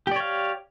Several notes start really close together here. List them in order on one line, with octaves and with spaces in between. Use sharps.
G4 D5 C#5 F5